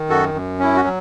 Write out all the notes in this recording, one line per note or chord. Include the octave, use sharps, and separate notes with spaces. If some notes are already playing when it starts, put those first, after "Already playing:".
Already playing: D#3
F#2 F#4 A4
F#2
C#4 E4
F#4
F#3